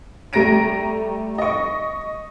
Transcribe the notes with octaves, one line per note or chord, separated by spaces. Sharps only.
G3 A3 A#5 A#6 D7 D#7
D#5 C#6